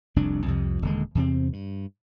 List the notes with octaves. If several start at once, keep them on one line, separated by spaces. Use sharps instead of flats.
F1 C2 F2 D4
C2 F2 C3
D#1 D3 G#3
E2 C3 C4
G2